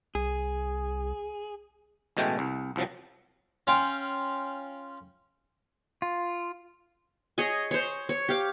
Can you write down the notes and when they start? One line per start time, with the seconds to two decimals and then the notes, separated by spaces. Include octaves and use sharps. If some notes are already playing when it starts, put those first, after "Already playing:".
0.15 C2 G#4
2.17 A1 B2 G#3 A3 G5
2.39 C2
2.76 C2 F3 F#3
3.67 C#4 F4 F5 G5
6.02 F4
7.38 G#4 C#5 D#5 G#5
7.71 C5 C#5
8.09 C#5
8.29 G4 F5